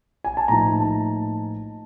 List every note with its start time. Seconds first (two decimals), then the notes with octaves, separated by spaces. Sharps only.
0.24 G#5
0.37 A5
0.48 A2 F3 A#3 D#4 A#5
0.80 A5